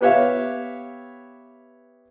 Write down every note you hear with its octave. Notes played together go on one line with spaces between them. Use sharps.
B3 G4 B4 C#5 E5 F5